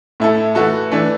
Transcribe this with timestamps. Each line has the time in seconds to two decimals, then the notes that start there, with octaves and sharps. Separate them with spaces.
0.20 A2 A3 E4 A4
0.55 E3 A3 F#4 A4
0.92 E3 A3 D4